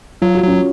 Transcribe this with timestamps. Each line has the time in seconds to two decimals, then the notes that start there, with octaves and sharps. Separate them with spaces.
0.22 F#3 F4
0.35 F#4
0.44 F#3 C#4 F4